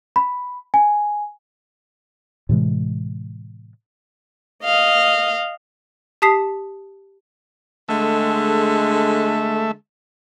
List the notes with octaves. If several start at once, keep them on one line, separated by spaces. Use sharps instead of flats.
B5
G#5
A2 C3 E3 G#3
D#5 F5
G4 A5 D#6 B6 C7
D3 G#3 A3 E5